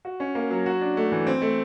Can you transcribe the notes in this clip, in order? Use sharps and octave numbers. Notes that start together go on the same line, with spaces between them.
F#4
C#4
A#3
F#3
F#4
D4
A3
E3
C4
A3